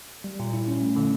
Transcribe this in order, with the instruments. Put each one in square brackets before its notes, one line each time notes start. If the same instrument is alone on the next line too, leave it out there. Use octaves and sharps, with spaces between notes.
[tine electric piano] G3
A#2
E4
C#4
A3
D3